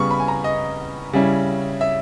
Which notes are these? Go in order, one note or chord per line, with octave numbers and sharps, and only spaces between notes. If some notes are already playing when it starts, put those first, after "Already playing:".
Already playing: C#3 G3 B3 C#6
B5
G#5
A#5
D#5
C#3 G3 C#4 E4
E5